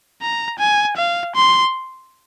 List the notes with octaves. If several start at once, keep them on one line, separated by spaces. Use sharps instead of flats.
A#5
G#5
F5
C6